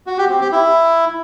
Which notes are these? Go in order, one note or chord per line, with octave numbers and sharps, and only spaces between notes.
F#4
G4
C4
G4
E4